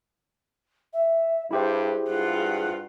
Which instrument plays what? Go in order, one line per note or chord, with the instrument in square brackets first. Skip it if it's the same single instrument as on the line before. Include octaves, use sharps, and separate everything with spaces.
[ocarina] E5
[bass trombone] G2 [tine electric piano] E4 G4 C5 [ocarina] G#4
[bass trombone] G2 [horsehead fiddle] F4 F#5